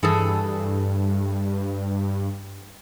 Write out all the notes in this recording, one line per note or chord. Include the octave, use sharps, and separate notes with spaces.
G2 E3 G#4 A4